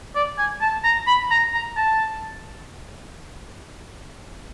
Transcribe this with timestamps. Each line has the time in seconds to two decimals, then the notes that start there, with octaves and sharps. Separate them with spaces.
0.15 D5
0.38 G#5
0.61 A5
0.84 A#5
1.07 B5
1.31 A#5
1.54 A#5
1.77 A5